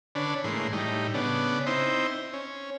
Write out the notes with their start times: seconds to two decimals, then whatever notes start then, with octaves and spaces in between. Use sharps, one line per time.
0.15 D3 C#4 D4 B4
0.44 A2 E3 G#3 A#3 C6
0.73 A2 G3 D#4
1.14 C#3 B3 D4
1.66 C4 D#4 E4 C5
2.33 C#4